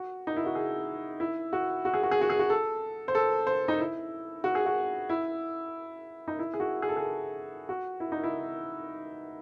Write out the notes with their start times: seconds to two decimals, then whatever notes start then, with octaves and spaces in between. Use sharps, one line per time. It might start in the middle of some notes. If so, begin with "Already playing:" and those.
Already playing: F#4
0.27 D#4
0.37 E4
0.46 F#4
0.55 G#4
1.20 E4
1.53 F#4
1.85 F#4
1.94 G#4
2.03 F#4
2.11 G#4
2.21 F#4
2.30 G#4
2.39 F#4
2.50 A4
3.08 C5
3.15 A4
3.47 C5
3.68 D#4
3.80 E4
4.44 F#4
4.55 G#4
4.66 F#4
5.09 E4
6.28 D#4
6.39 E4
6.54 G#4
6.60 F#4
6.82 G#4
6.89 A4
6.97 G#4
7.69 F#4
8.00 E4
8.12 D#4
8.23 E4